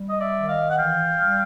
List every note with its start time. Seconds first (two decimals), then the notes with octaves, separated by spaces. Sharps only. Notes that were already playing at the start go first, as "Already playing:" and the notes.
Already playing: G3
0.09 D#5
0.21 D5 E5
0.34 D#3
0.48 D#5 F5
0.69 F#5
0.76 E3 F5 G5
1.19 G3